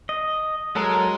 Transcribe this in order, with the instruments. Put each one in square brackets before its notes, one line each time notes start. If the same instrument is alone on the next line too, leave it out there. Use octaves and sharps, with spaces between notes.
[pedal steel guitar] D#5
[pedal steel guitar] F#3 A4 A#4 [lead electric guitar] G#3